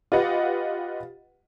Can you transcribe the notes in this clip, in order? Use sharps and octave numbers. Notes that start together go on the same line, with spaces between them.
F4 G4 B4 D#5 F#5